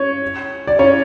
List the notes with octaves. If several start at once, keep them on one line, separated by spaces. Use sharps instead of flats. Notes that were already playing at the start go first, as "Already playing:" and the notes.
Already playing: C#4 C#5
D5
C#4 C#5